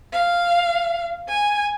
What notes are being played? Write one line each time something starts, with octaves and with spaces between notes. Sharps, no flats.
F5
G#5